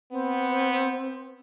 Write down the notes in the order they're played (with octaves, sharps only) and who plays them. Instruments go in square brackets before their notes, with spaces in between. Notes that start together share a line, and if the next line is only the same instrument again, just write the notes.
[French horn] B3 [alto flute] C4